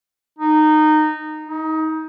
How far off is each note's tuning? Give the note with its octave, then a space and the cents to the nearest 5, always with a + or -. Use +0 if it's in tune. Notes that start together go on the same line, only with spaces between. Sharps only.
D#4 -15
D#4 +25